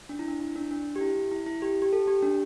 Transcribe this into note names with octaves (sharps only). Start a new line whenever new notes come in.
D4
E4
D4
E4
D4
D4
G4
E4
E4
E4
G4
G4
A4
G4
D4